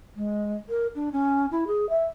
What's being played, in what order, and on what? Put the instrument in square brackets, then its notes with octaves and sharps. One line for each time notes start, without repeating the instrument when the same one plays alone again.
[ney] G#3
A#4
D4
C#4
E4
G#4
E5